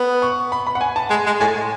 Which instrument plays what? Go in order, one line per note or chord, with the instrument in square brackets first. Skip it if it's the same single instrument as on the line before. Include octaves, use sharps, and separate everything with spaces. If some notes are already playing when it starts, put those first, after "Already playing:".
Already playing: [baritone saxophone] B3
[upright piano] C#6
B5
B5
F#5
G#5
A5
[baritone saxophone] G#3 [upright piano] G#5
[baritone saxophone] G#3
[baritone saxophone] A2 [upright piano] G#5